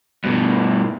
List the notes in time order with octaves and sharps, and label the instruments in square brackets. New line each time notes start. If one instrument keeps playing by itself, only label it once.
[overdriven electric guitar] G2 B2